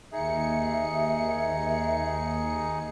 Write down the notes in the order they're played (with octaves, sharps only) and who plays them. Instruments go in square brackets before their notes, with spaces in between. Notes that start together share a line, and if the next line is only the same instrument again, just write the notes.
[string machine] D#2 C#7 [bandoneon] D#4 G#4 [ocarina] E5